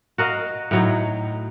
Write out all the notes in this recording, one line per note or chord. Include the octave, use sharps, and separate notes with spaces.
F#4 A#4 D#5 F5
A2 F#3 D#4